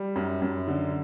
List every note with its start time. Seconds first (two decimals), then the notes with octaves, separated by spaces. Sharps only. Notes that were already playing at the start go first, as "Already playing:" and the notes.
Already playing: G3
0.16 F#2
0.42 F#2
0.68 D3